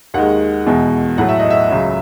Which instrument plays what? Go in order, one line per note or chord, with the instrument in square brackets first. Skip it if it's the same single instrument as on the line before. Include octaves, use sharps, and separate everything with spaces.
[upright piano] D#2 D#3 G#3 F#5
E2 B2 G#3
A2 F#3 A3 F#5
E5
D#5
E5
C#2 C#3 F#3